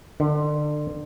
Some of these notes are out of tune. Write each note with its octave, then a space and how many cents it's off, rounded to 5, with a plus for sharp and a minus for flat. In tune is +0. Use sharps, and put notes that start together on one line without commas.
D3 +30